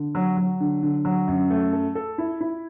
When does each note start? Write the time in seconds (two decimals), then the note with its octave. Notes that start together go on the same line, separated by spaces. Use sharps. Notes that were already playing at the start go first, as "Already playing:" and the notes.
Already playing: D3
0.15 F#3
0.37 F#3
0.60 D3
0.83 D3
1.05 F#3
1.28 F#2
1.50 A3
1.73 A4
1.95 A4
2.18 E4
2.41 E4